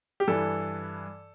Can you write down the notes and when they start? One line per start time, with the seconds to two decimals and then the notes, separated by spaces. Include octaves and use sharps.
0.20 G4
0.28 G2 E3 A4